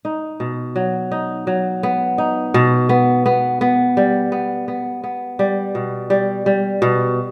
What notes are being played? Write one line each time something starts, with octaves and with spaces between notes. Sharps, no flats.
D#4
B2
F#3
D#4
F#3
B3
D#4
B2
B3
B3
B3
G3
B3
B3
B3
G3
B2
G3
G3
B2